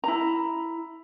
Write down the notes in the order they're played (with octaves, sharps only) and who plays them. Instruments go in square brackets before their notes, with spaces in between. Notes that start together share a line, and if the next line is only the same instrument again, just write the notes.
[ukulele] E4 A#5